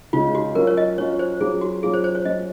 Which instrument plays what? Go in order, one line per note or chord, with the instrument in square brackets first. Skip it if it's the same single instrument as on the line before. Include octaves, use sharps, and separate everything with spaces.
[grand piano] C#3 G#3 D#4 [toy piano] F4
[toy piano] F#4
[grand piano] F#3 C#4 F4 [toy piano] A#4
[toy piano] C#5
D#5
[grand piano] F#3 C#4 F4 [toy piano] C#5
[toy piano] C5
[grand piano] F#3 C#4 F4 [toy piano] G#4
[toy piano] F#4
[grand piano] F#3 C#4 F4 [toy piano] G#4
[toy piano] C5
C5
C#5
[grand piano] F#3 C#4 F4 [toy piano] D#5